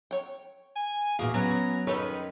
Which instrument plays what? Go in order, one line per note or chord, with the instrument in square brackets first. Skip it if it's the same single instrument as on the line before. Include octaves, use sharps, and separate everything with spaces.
[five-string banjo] C#5 G5
[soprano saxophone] G#5
[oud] E2 A#2 [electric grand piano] F#4 F5 [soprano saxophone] G#4
[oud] F#3 [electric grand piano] B3 C#4 B4 [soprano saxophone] A#5
[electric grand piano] F#2 [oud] D#3 [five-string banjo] G4 A4 C#5 [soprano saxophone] B4